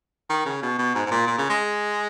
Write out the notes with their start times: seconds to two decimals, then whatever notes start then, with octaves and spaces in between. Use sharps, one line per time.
0.30 D#3
0.46 C#3
0.62 B2
0.78 B2
0.95 G#2
1.06 G#2
1.11 A#2
1.27 A#2
1.38 C#3
1.50 G#3